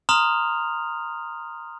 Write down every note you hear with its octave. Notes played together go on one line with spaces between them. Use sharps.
A#5 C6 D#6 F6 F7